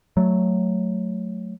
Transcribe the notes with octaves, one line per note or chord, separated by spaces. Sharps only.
F#3 A3